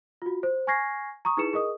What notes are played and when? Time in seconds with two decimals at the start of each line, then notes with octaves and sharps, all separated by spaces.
0.22 F4 F#4
0.43 C5
0.67 G#5 C#6 F6 G#6 A#6 C7
1.25 A#5 C#6 D#6
1.37 D#4 E4 G#4 B4 C#7 E7
1.53 G#4 A#4 D#5 D#6